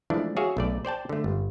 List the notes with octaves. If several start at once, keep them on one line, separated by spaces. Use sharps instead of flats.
E3 F3 G#3 A3 D4 E4
F#4 G#4 C#5 E5 F5
B1 A3 D5
C5 D5 G5 A5
D3 A3
G1